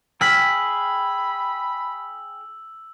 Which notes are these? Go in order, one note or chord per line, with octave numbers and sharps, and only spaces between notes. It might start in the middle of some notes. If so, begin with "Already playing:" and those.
G#4 G5 B5 E6 F6 B6 F#7